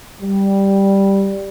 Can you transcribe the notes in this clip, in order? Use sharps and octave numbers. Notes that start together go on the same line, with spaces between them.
G3